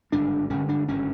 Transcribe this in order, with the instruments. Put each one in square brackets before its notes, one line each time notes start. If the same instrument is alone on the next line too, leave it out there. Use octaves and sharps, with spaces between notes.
[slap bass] G#1 G2 D3 D4
G#1 G2 D3 C#4
D4
G#1 G2 D3 C#4